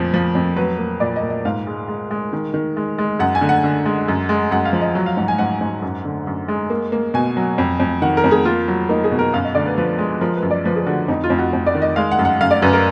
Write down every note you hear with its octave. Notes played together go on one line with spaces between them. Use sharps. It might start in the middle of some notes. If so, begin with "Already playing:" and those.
Already playing: F2 A#2 F3
F3
F2
F#3 B4
A#3
A#2 D5
D#5
A#2
D#5
G#2 F5
G#3
G#3
G#3
D#3
D#3
G#3
G#3
F#2 F#5
G#5
D3
F#5
D3
G#3
F#2
G#3
F#2 F#5
F5
F3
D#5
F#3
F5
G#2 F#5
G#5
G#2 F#5
G#2
F#2
D3
F#2
G#3
A#3
A#3
B2 G#5
F#3
F2
F2
D#3 F#5
A#4
F2
G#4
A#3 F4
F#3
A#3 D#4
G#4
B2
A#4
F#2 F5
D#5
D3 D5
B4
F3 B4
G#3
F3 A#4
B4
F#2
D5
F3 B4
G#4
D3 F#4
F2 D#4
F4
F2
F#4
F2
D5
D#3
D#5
G#3 F5
F#5
F#2
F#5
F#2 F5
D5
F#2 B4
A#4